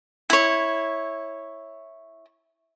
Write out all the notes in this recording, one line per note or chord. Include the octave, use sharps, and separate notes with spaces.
E4 C#5